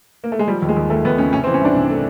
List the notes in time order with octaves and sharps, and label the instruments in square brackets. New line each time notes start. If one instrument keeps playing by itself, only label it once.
[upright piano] A#3
A3
G#3
[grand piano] F3 [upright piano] G3
[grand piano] D#2
[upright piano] G#3
[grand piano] D#2
[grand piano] D#2 [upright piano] A3
[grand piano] D#2 [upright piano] B3
[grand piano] C#3 [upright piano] C#4
[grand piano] C3 [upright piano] C#4
[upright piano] C4
[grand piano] E3
[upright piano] C#4
[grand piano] C2 [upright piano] D4
[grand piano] C3
A3